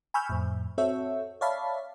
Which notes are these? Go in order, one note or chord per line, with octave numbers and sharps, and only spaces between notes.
G#5 B5 C#6 E6 F6 G6
F2 A2
C4 F#4 A4 C#5 E5
C#5 D5 E5 F5 A5 B5